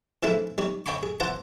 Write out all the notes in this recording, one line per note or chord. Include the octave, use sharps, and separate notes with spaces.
E3 F3 G#3 A3 D#4 E4
G3 D#4 C#5
C#5 D#5 G5 G#5 B5 C#6
G#4
E3 C5 F#5 A5 A#5